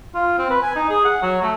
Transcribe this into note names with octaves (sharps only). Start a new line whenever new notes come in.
F4
C4
B4
G#5
D#4
G#4
F#5
F#3
A3